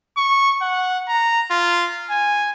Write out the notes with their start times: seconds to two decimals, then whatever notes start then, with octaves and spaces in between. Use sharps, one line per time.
0.17 C#6
0.61 F#5
1.08 A#5
1.51 F4
2.10 G#5